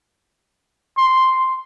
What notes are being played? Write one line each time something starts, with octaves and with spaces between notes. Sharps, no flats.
C6